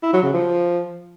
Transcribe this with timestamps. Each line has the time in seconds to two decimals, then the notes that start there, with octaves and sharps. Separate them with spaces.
0.03 E4
0.13 F#3
0.23 C#3
0.33 F3